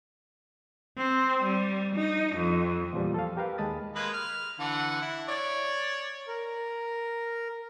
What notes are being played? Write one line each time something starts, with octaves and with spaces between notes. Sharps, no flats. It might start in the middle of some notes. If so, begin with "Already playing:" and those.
C4
G3
D#4
F2
E2 A#2 F3 G3
A4 F5
G4 A#4 B4 F5
D#2 G#3 A5 B5 D#6 A6
G#3 A#3 B4
F6
D3 E3 F#5
E4
C#5 D5
A#4